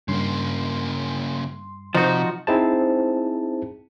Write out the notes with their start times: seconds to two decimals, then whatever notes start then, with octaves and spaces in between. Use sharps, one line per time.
0.08 G2 C#3 A#3 C6
1.95 C3 F3 D#4 F#4 C5
2.47 C4 D#4 E4 G#4 C5 A5